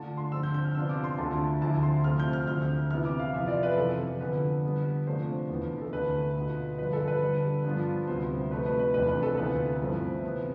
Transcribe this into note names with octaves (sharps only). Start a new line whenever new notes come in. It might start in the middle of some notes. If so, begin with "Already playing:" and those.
Already playing: D3 A3 D4 F4 A5
C6
D3 F3 C4 E6
G6
G6
F6
C3 F3 B3 D4 F4 E6
D6
C6
D2 D3 A3 D4 F4 A5
D2 D3 F3 C4 E4 A5
C6
C3 F3 A3 C4 F4 F6
G6
F6
D2 D3 F3 F6
C3 E3 B3 E4 F6
D6
F5
F2 C3 E3 B3 F4 E5
D5
B4
F2 C3 E3 A4
D3 F3 B3 B4
D3 G3 B3
C3 F3 A3 D4 F4 C5
E2 C3 E3 B3 D4
A4
D2 D3 A3 B4
B2 B3 F4
G2 D3 F3 B4
A4
B4
D3 G3 D4
G2 F3 B3 D4 F4
D2 C3 G3 B3 C5
C3 F3 A3 B4
B4
B4
E2 C3 F3 A3 D4 B4
B4
A4
D2 C3 E3 B3 F4 B4
G2 F3 A3 C4 E4
C3 E3 B3